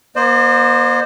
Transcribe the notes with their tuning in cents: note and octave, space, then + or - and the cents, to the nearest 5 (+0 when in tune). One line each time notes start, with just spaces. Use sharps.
A#3 +45 C5 +0 D#5 -45